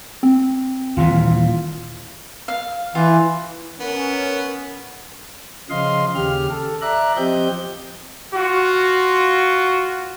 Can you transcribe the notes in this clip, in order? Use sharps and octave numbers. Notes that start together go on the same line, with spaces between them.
C4
D#1 A#2 E3 F4
F5
E3 F4
B3 C#4 A#4
C#3 F3 D#5 F5 C6
D#2 C#3 G4 F6
A4
D5 E5 A#5 F#6
F3 C4 G4 D#5 G6
F4 F#4